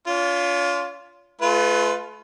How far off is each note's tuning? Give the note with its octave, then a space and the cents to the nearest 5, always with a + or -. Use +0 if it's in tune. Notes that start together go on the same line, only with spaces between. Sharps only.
C#4 +45 F4 +0
A3 -40 F4 +0 B4 +20